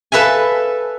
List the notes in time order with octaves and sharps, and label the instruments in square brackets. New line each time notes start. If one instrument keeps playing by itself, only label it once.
[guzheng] A4 B4 E5 F5 G#5